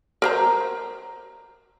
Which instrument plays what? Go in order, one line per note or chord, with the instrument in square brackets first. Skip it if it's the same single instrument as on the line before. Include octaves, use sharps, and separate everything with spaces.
[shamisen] A#4 C5 A#5